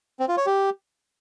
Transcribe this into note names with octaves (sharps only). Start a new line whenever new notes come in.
C4
F4
C#5
G4